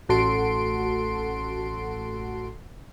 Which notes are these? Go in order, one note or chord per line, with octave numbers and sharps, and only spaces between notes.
A1 F#4 A4 C6 D7